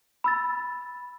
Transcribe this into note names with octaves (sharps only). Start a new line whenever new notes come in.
B5 E6 A6